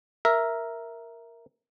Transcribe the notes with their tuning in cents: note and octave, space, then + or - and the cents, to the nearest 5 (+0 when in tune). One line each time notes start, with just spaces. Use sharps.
A#4 +0 E5 +0